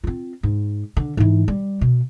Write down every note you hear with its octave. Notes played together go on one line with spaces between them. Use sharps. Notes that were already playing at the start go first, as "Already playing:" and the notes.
C4 F4
G#2
D3
G#2 E3
G3
B2